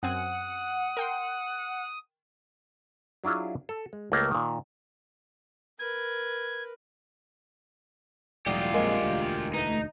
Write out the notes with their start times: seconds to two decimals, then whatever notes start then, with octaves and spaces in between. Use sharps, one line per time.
0.03 F#2 C4 F#5 G#5 D#6
0.97 A#4 G5 C6
3.24 F#3 D4 E4 F4 G#4
3.69 A4
3.93 G#3
4.12 C#2 A3 A#3
4.31 A#2 D#3
5.79 A#4 B4 G#6
8.46 E1 A2 F#3 G3 F4 G4 D#5
8.74 A#1 F2 G#3 A#3
9.02 E1 D2
9.54 E3 A3 D#4